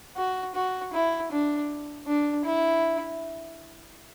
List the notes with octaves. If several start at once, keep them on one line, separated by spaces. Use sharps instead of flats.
F#4
F#4
E4
D4
D4
E4